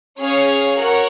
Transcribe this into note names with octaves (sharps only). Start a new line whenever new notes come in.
C#4 G#4 C#5 F5
F#4 A#4 C#5 F#5